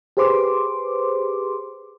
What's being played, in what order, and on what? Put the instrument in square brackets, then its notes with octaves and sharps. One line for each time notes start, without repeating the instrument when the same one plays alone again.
[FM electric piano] G4 G#4 B4 C5 C6 D6